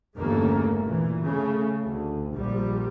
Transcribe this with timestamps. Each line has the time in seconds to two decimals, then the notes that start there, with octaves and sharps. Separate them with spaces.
0.17 G1 E2 C#3 A3 A#3
0.85 A#2 E3
1.22 C#3 A3
1.86 D2
2.34 A#1 A#2 F3 G3